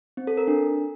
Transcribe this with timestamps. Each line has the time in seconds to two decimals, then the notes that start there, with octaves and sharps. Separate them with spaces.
0.17 C4
0.27 A4
0.37 A#4
0.48 D4